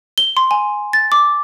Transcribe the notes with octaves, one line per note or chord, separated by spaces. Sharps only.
G7
C6
G#5
A6
D6